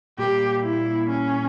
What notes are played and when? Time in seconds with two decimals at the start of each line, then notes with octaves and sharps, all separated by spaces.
0.18 A#2 G3 A#3 G4
0.63 E4
1.07 C#4